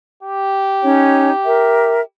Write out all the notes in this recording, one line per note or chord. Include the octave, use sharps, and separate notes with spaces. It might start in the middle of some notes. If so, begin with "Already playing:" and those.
G4
C#4 D#4 C#5
A#4 E5